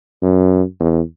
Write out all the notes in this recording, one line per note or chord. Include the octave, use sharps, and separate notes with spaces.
F#2
E2